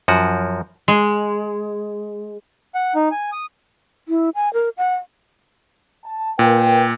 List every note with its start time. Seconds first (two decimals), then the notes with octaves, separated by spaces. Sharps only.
0.08 F#2 F3 F#4
0.88 G#3
2.75 F#5
2.95 D#4
3.11 G#5
3.32 D#6
4.08 E4
4.35 G#5
4.54 A#4
4.78 F#5
6.05 A5
6.39 A#2 A#4 B4 G5